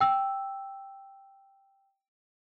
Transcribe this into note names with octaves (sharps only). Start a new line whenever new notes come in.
G5 E6